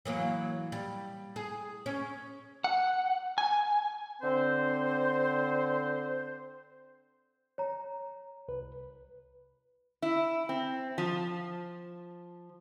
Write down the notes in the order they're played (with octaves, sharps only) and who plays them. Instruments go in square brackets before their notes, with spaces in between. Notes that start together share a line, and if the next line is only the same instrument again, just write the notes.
[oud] E3 F#3 A#3
G3
G#4
C#4
[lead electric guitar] F#5
G#5
[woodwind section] D3 C4 C5
[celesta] C#5 A#5
[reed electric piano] C2 B4
[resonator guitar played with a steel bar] E4
C4
F3